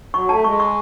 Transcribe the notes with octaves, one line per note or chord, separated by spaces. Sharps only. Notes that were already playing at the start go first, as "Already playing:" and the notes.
F#3 C#6
A3 A5
G#3 C#6
C#6